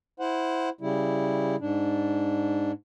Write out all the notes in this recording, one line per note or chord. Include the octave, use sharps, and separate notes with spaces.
E4 C5 F#5
C#3 G3 E4
G#2 D4